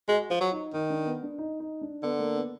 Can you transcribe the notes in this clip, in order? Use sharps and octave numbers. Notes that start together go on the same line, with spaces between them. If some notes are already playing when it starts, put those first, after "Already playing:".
G#3 F#4
F3 F4
F#3
D#4
D#3 D#4
D4
B3
D4
D#4
D#4
D4
D3 B3
A#3
B3